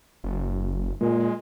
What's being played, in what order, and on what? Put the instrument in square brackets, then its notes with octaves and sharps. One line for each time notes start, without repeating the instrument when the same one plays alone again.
[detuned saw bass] F#1
[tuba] A#2 [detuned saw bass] G#3